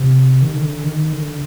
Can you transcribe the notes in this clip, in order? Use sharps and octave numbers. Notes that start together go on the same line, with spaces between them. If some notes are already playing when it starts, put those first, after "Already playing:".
Already playing: C3
D#3
D3
D#3
D3